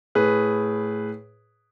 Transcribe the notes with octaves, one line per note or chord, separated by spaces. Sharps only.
A2 G#4 B4